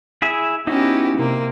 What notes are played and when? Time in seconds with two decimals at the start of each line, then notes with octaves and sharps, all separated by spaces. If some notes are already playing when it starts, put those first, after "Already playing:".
0.22 E4 G#4 E5
0.67 B3 C#4 D#4 E4 F#4 G4
1.18 C3 A#3